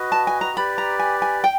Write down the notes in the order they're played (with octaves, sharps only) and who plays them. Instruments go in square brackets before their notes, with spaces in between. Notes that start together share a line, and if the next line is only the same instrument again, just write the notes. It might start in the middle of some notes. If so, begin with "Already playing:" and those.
Already playing: [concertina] F#4 B4 D#5
[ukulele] A5
G#5
A#5
[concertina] G4 B4 D5 [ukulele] B5
[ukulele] A#5
G#5
G#5
G5